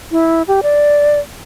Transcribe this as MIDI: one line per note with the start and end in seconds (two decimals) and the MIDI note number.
0.11 0.43 64
0.48 0.61 67
0.63 1.19 74